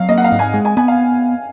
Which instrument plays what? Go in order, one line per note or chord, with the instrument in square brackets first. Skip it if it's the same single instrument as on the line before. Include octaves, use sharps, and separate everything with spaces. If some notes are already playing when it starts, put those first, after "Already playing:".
Already playing: [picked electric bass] F#3 [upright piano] F5
[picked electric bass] A#3 [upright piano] D#5
[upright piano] F#5
F5
[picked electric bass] G#2
[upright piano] G#5
[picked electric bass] G#3
[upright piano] G#5
[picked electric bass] B3 [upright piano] G#5
[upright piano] F5